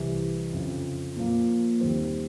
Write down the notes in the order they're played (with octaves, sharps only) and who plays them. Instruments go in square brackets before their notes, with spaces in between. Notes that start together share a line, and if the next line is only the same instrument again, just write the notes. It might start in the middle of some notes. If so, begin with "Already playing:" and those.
Already playing: [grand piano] C2 C3 E3 G3
F2 C#3 F3
A#2 F3 A#3
D#2 D#3 G3 C4